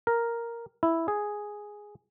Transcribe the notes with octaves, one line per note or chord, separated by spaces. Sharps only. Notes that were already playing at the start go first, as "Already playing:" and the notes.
A#4
E4
G#4